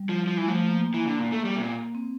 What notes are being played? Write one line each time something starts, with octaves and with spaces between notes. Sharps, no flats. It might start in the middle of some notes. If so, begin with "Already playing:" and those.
Already playing: G3
F3
F3
E3
F3 A3
A#3
E3
D3
A#2
A3
G3
C3
A#2
C4